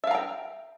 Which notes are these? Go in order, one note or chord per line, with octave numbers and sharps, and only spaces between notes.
E5 F5 G5 A#5